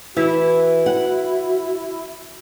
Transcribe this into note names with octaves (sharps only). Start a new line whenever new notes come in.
E3 E4 F#4
F#5